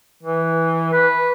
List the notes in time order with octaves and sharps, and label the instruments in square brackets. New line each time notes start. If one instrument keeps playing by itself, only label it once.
[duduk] E3
B4